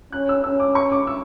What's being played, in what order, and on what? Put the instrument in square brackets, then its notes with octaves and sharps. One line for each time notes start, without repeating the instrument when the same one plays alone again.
[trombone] C#4 [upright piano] F#6
[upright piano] E6
[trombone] C#4 [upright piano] E6
[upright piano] D6
C#6
D6
E6